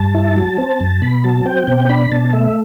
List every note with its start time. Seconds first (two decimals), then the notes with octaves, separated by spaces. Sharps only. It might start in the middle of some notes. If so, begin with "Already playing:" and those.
Already playing: G2 A5
0.14 E4
0.37 F#3
0.58 C4
0.80 F#2
1.02 B2 B5
1.24 F#3 A5
1.46 C4 G5
1.67 B2 G5
1.89 D4 B5
2.12 B2 A5
2.33 A3 E5